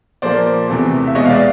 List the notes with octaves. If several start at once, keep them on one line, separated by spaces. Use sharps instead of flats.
A#2 F3 A#3 C5 D5
E2 C3 E3 A3
E5
E2 B2 G#3 B3 C#5 D#5
F5
D5 E5